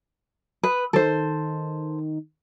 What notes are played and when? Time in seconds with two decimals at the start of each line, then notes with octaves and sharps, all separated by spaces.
0.63 B4 D#6
0.93 D#3 A4 C5